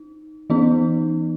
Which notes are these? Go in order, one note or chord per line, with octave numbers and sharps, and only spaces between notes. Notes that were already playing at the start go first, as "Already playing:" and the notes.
Already playing: D#4
E3 B3 D#4